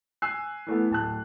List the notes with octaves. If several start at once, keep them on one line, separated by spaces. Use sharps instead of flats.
G#5 E6 F#6 C7
E3 A3 B3
D1 A5 F#6